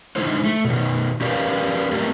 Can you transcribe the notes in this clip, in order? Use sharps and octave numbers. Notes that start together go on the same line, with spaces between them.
D3 G#3 D#4 E4 C5
A3
B2 D#3
C#4 G4 A#4 B4 D5 F5
A3 A#3 C4 G4 A4 A#4